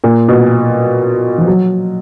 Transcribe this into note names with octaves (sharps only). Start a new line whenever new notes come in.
A#2
B2
F3
F#3